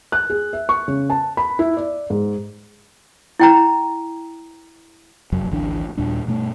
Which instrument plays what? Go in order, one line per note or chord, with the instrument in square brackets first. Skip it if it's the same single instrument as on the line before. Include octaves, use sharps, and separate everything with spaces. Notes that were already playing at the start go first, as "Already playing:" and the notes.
[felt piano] F#6
G#4
E5
C#6
C#3
A5
B5
E4
D5
G#2
[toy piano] E4 G5 A#5
[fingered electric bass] F1 F#2 F#3
G#1 D2 E3 D4
D#2 A#2 G3 D4
G2 B2 A3